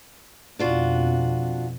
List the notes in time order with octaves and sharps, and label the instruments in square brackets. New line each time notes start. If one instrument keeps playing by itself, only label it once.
[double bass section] F2 B2 [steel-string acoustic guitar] D4 F4 F#4